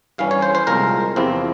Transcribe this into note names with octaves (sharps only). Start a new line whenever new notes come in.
G2 E3 G3 C#4 F5
C#5
C5
C5
C2 A#2 F3 G#3 C4 A#4
E2 C3 F3 C4 E4